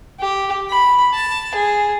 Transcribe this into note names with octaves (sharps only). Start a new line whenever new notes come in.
G4
B5
A5
G#4